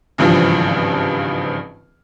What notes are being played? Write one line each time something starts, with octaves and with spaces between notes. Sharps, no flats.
G#1 C#2 G2 E3 F3